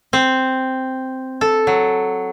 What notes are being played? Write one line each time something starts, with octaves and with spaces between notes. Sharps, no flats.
C4
A4
F#3